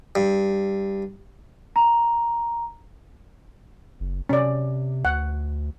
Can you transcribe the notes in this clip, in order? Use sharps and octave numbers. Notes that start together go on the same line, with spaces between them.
G2
A#5
F#1
C3 C#4 D5
D2 F#5